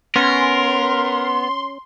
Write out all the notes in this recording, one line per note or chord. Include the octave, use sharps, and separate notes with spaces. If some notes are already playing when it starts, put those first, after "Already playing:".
B3 C#4 A#4 C6